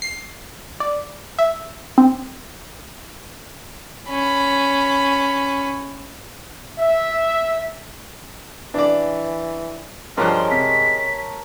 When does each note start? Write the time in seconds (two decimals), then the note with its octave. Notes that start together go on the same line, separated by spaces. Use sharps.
0.02 C7
0.80 D5
1.39 E5
1.98 C4
4.09 C#4 B5
6.79 E5
8.74 E3 D4 D5
10.17 G2 F3 G#3 A#4 C#5 A5 C6 F#6
10.51 C3 B6